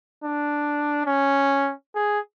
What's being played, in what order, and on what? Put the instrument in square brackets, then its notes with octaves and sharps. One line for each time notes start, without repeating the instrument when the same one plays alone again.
[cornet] D4
C#4
G#4